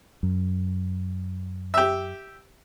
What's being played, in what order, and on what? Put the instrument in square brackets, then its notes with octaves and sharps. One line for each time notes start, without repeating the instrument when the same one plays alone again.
[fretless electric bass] F#2
[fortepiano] G4 E5